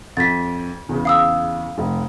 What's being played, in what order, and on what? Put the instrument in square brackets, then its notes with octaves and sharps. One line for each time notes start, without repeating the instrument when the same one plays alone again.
[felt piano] F2 [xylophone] A6 B6
[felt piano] E2 C#3
[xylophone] F5 D#6 E6
[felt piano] F1